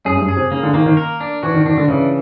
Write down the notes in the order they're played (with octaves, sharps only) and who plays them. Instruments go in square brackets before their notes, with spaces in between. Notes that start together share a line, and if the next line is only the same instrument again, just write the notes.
[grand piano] F#2 [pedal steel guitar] G#4
[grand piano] G2
F#2
[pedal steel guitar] G#4
[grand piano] C3
[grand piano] C#3 [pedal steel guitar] A#3
[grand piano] D3
[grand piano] D#3 [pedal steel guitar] A#3
[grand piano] D#3
[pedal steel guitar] A#4
D4
[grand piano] E3 [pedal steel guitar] F#4
[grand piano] D#3
[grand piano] D#3 [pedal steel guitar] D4
[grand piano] D3
[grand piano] C#3 [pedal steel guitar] E3